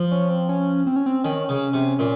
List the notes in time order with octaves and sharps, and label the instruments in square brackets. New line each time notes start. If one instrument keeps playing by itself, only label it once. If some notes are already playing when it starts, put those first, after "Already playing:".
Already playing: [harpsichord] F3
[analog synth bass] C#4
C4
C#4
C4
C#4
C4
[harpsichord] D#3 [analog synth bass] C#4
[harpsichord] C#3
C3
A#2